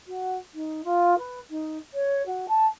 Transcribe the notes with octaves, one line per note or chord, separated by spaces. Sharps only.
F#4
D#4
F4
B4
D#4
C#5
F#4
A5